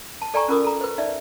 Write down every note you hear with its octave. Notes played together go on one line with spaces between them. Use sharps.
A5
A4 D5 G5 G#5 A#5 C#6
C#4 F4 A#4 D6 D#6
A4 A#5
B4 C5
D#4 D5 E5